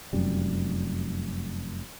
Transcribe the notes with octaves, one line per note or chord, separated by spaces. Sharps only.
F1 F#2 G3